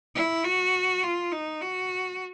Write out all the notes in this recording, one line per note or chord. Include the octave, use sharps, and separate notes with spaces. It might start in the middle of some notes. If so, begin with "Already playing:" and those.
E4
F#4
F4
D#4
F#4